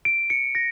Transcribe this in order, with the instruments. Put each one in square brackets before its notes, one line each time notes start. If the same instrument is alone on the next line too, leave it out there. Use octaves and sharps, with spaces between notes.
[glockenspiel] D7
C#7
A#6